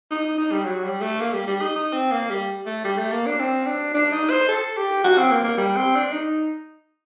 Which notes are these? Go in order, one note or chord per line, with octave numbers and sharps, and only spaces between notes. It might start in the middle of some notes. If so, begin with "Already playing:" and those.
D#4
D#4
D#4
G3
F#3
G3
A3
A#3
G3
G3
D#4
D#4
C4
A#3
G3
A3
G3
A3
A#3
D4
C4
D4
D4
D#4
C5
A4
G4
F#4
C4
A#3
A#3
G3
C4
D4
D#4